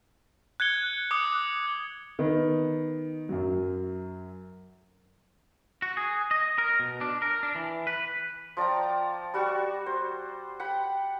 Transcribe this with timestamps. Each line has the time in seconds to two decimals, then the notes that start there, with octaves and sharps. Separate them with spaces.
0.60 F#6 G#6 C#7 G7
1.11 D6 D#6 F#6 C#7
2.19 D#3 B3
3.29 F#2 F#3
5.82 F#4
5.97 G#4
6.31 D#5
6.58 A#4
6.80 B2
7.01 D4
7.22 A#4
7.43 D4
7.55 E3
7.87 B4
8.57 F3 D5 G5 A#5
9.34 G3 F#4 D5 C#6
9.86 C5
10.60 F#5 G5 B5